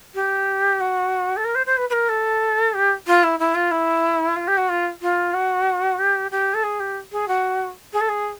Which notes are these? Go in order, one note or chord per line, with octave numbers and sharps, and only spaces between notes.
G4
F#4
A4
A#4
C5
C5
B4
B4
A#4
A4
G4
F4
E4
E4
F4
E4
F4
G4
F#4
F4
F4
F#4
G4
G4
A4
G#4
G4
G#4
F#4
G#4
A4
G#4